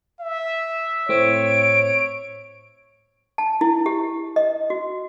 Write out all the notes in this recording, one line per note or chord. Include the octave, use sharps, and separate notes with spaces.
E5
A2 C4 C#5 D7
A5
E4
G4
D#5
F#4